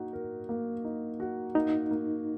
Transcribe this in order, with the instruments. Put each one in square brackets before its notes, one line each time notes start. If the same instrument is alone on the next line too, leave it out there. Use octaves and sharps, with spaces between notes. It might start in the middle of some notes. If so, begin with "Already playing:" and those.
Already playing: [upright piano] A#3 D#4 F#4
A#4
A#3
D#4
F#4
[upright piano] A#3 [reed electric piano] D#4
[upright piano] A#3